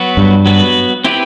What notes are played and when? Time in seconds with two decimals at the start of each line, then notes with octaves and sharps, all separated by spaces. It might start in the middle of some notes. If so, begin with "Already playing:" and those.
Already playing: F#3 B3 F#4 B4
0.17 G2
0.46 F#3 B3 F#4 B4
1.04 C4 E4 G4 B4